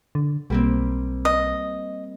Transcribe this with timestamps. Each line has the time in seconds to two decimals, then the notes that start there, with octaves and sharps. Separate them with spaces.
0.15 D3
0.50 B1 G3 A#3 C4
1.25 D#5